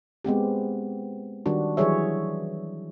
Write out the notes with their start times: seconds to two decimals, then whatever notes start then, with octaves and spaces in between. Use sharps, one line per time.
0.25 G#3 B3 C4 G4
1.46 D#3 G3 D4 F#4
1.77 E3 F#3 G3 G#4 C#5 E5